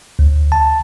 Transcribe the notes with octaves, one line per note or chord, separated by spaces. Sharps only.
D2
A5